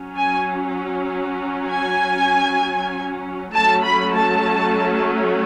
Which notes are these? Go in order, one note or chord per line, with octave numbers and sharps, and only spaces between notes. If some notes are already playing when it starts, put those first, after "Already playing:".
Already playing: F#3 C#4
G#5
G#5
F#3 A3 C#4 A5
B5
A5